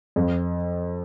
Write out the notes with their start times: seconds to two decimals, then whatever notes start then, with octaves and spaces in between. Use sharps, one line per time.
0.16 F2